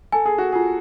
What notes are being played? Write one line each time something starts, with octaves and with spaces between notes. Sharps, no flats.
A4 G#5
G#4
F#4
F4 G#4